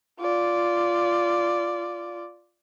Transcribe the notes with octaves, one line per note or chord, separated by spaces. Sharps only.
F4 D5